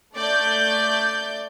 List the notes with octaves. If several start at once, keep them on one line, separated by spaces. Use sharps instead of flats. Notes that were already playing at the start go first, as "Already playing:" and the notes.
A3 D5 G6